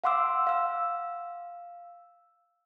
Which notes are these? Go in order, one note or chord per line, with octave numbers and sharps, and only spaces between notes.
F5 F#5 C6 D6 E6
F5 E6